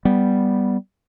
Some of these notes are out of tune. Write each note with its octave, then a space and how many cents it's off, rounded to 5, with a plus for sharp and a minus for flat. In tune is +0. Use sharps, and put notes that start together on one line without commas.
G3 +0 B3 +0